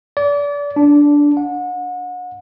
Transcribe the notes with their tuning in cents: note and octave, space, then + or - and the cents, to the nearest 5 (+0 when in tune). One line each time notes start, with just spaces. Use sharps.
D5 -30
D4 -10
F#5 -35